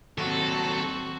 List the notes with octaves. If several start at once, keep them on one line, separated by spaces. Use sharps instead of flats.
D#2 F#3 C4 F#4 A4